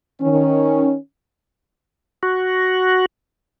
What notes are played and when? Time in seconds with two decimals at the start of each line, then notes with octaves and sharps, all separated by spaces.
0.20 D#3 C#4
2.23 F#4